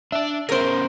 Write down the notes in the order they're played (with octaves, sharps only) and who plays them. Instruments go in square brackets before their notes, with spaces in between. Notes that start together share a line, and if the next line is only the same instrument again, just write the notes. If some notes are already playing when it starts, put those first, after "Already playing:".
[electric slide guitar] D4 D5 [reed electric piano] E5
[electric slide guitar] B3 C#4 G#4 [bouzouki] A#4 C5